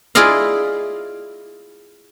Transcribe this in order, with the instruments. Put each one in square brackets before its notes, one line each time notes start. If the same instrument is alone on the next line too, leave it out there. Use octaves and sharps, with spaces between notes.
[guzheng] E4 F4 G#4 D5 D#5 F5